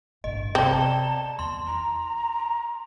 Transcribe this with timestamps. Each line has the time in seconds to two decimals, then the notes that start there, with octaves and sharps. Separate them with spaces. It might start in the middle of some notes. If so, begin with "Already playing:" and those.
0.24 A1 G2 D#5
0.55 C3 B3 C4 D5 A5 A#5 G7
1.39 E2 D#3 C6
1.67 E4 A#5